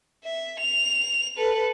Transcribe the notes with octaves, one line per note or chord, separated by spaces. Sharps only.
E5
F7
A4 B4